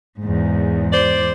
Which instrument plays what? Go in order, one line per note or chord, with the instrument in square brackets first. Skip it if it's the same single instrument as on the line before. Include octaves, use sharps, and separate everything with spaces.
[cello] E2 G#2
[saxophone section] C5 D5